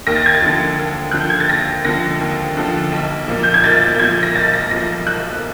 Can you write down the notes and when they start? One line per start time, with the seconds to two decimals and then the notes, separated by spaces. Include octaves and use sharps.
0.07 D#2 A#6
0.16 A6
0.26 G#6
0.35 A6
0.42 D3 F3
0.78 D#2
1.11 D3 F3 F#6
1.20 G6
1.30 G#6
1.40 A6
1.49 D#2 A#6
1.85 D3 F3 A#6
2.20 D#2
2.57 D3 F3
2.92 B1
3.28 A#2 F3
3.43 G6
3.54 G#6
3.64 B1 A6
3.95 G6
4.00 A#2 F3 G#6
4.23 A#6
4.35 B1 A6
4.54 A#6
4.71 A#2 F3 A#6
5.06 B1 F#6